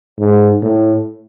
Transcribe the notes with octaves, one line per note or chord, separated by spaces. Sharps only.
G#2
A2